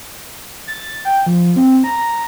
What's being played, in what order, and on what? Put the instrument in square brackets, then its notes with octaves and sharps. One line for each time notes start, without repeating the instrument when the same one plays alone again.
[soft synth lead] A6
G5
F3
C4
A#5